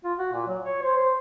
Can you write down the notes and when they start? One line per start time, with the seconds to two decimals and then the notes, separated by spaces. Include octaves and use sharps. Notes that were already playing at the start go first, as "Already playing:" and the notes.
0.04 F4
0.18 F#4
0.33 A#2
0.47 F#3
0.64 C#5
0.83 C5
0.97 C5